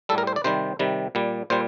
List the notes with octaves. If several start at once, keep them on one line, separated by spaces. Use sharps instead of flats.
A2 G3 A4
A#4
C5
D5
C3 D#3 G3 C5
C3 D#3 G3
A#2 G3
A#2 G3 C5